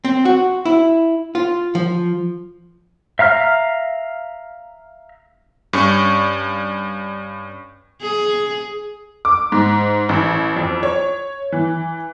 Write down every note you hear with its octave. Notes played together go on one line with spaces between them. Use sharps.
C4
F#4
E4
F4
F3
E5 F5 A#5 F6
G2 C#4 C#6
G#4
D6
G#2
A1
F2
C#5
E3